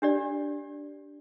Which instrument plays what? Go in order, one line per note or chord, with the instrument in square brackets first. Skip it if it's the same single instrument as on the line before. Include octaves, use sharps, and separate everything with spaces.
[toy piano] D4 G4 D5